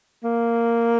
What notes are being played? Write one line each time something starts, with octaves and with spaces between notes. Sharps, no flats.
A#3